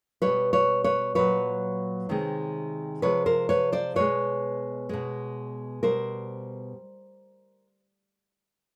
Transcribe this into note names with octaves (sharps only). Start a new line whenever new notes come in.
B2 G3 B4 C#5
B4 C#5
B4 C#5
A#2 F#3 B4 C#5
C3 D#3 G#3
C3 F3 G#3 B4 C#5
A#4 C5
B4 C#5
C5 D5
B2 G#3 B4 C#5
B2 G#3
B2 G3 A#4 C5